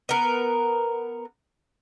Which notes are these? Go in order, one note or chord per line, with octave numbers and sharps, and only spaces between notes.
B3 A#4